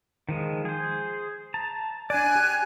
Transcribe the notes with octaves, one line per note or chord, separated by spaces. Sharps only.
D#3 F3 G#3
G#4 C5
A5 A#5
D4 D5 G#5 F#6
G4